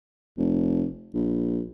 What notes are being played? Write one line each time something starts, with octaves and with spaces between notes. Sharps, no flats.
F1
A#1